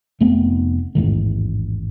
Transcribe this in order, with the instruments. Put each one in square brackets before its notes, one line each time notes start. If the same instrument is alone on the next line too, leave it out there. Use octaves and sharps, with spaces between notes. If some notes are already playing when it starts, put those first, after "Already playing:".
[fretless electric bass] F1 A3 B3 C4
A1 E2 G#2 D#3